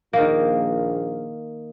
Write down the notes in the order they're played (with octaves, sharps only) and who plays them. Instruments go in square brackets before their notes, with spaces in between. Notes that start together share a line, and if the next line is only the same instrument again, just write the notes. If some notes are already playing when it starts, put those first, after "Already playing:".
[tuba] A#1 [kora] D#3 A#3